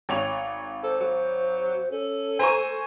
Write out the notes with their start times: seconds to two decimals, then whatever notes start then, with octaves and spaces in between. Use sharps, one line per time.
0.09 G#1 C#5 F7
0.83 A4 C5
1.00 F#3
1.92 C#4 A4
2.40 C5 G#5 A#5 C#6